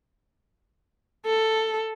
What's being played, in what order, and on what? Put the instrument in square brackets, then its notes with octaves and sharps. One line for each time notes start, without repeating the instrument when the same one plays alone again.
[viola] A4